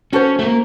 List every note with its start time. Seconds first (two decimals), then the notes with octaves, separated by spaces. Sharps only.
0.13 C#4 F#4 A4 C5
0.39 A3
0.43 A#3